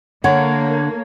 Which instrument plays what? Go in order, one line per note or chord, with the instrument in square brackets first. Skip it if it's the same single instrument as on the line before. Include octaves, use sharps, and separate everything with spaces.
[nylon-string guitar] D3 [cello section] A#3 [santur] C#5 [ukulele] F#5